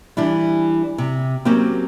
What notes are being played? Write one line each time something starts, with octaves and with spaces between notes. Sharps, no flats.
E3 G3 D4 E4
C3
F#3 A#3 C4 C#4 G4